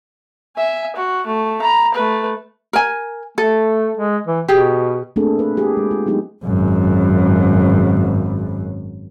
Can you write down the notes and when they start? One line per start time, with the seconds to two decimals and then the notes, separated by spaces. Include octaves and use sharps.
0.57 E5 G#5
0.96 F#4
1.27 A3
1.62 A#5 B5
1.95 A3 B4
2.73 A#4 G#5
3.38 A3 A4
3.97 G#3
4.27 E3
4.48 B2 G4 G#4
5.16 A3 A#3 C4 D4 G#4 A4
5.39 B4
5.57 F4 G4 G#4
5.77 G#3
5.91 F4
6.06 F#3 G#3 B3 D#4 G4 G#4
6.45 G#1 F#2